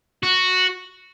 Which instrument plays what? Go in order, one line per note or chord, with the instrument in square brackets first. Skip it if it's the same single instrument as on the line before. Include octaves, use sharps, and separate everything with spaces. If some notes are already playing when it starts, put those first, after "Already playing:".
[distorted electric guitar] F#4